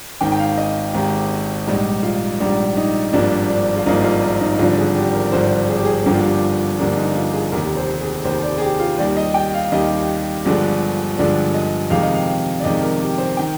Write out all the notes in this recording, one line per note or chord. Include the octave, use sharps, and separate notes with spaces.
G#1 G#2 D#3 G5
G5
F5
D#5
G#1 G#2 D#3 G4
A#1 G#2 G3 D#4
F4
A#1 G#2 G3 D4
D#4
G#1 G2 F3 A#3 D4
D4
F4
G#1 G2 F3 A#3 D4 D#4
F4
A#4
D#4
D#4
G#1 G2 D3 F3 F4
G#4
G4
A#4
G#1 G2 D3 F3 C5
G#4
G4
G#4
G1 G2 D3 F3 A#3 G4
F4
G4
G1 G2 D3 F3 A#3 D4
D#4
F4
G#4
F1 D#2 D#3 A#4
C5
G#4
F1 D#2 D#3 C5
D5
G#4
G4
F4
D#2 D#3 G3 D5
D#5
G5
F5
D#2 D#3 G3 D#5
G1 G2 D3 F3 G#3
G1 G2 D3 F3 G#3 D5
D#5
F2 C3 D#3 G#3 F5
D#5
F5
D5
F2 C3 D#3 G#3 D#5
A#4
G4
C5
D#3 G5